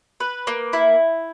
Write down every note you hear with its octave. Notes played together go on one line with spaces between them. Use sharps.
B4
A#3
E4